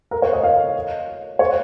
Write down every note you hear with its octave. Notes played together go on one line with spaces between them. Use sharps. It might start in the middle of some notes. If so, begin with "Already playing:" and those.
A#4
C#5
D#5
F5
C#5